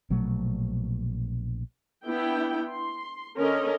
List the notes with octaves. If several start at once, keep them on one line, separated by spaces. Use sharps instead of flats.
A#1 B2 F#3 A3
B3 D4 E4 G5
C6
D3 C#4 A#4 D#5